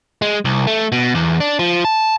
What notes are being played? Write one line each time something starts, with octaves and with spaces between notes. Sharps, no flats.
G#3
C2
A3
B2
E2
D4
F3
A5